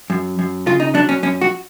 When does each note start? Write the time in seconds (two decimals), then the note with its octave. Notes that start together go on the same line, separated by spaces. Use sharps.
0.10 F#2
0.39 F#2
0.67 C#3 F4
0.80 D#4
0.94 F#3 D4
1.09 C#4
1.23 F#2 C#4
1.41 F#4